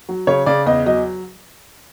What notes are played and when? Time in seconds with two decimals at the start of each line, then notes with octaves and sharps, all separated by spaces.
0.09 F#3
0.27 C#3 C#5
0.46 C#3 D5
0.66 E2 D#5
0.86 F#3 D#5